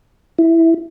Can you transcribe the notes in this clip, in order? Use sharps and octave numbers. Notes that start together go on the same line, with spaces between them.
E4